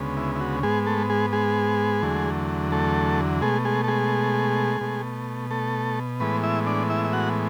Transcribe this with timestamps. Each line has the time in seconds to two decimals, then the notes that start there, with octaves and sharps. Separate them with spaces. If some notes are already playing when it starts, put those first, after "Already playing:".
Already playing: D2 C#3 G#3 B3
0.17 E4
0.35 E4
0.40 F#4
0.63 G#2 G#3 B3 G#4
0.86 A3 A4
1.10 G#3 G#4
1.33 G#3 G#4
2.02 E2 D3 F#3 A3
2.72 A3 A4
3.41 B2 G#3 A3 G#4
3.65 G#3 G#4
3.84 A4
3.88 G#3 G#4
4.81 B2 A3
5.51 A3 A4
6.20 A2 E3 G#3 B3 B4
6.43 E4 E5
6.67 D4 D5
6.90 E4 E5
7.05 E5
7.13 F#4 F#5